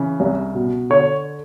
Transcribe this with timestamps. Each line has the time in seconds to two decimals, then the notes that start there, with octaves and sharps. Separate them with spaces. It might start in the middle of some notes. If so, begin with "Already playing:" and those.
Already playing: C#3 E3
0.20 C2
0.55 B2
0.90 D3 C#5